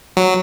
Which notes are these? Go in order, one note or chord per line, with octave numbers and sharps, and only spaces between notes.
F#3